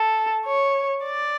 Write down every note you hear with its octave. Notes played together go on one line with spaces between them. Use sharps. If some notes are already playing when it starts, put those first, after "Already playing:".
Already playing: A4
C#5
D5